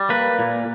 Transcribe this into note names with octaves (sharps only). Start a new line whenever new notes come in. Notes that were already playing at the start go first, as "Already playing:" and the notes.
Already playing: G3
A#3 B4
A#2